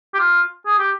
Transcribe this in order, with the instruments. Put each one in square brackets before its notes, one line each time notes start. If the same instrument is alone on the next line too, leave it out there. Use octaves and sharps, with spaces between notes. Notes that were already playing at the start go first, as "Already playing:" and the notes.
[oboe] G4
F4
G#4
G4